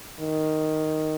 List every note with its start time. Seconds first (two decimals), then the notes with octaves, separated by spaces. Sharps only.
0.19 D#3